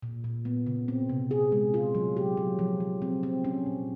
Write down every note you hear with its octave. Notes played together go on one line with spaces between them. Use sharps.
A#2
A#2
B3
C#3
C4
C3
G#4
G#3
F4
F#3
G4
F#3
F3
F3
C4
C4
C#4
A#2